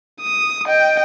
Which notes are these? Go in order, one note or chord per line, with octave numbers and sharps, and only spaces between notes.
D#6
D#5 G5